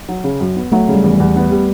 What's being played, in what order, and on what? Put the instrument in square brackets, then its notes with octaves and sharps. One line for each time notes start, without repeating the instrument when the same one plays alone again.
[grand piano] F#3
C#3
F#2
B3
[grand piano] F#3 [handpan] A3
[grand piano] C#3
[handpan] G3
[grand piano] E2
[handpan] G3
[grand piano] E2
B3
G3